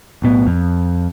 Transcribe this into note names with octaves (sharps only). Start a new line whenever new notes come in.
B1 A2 B3
F2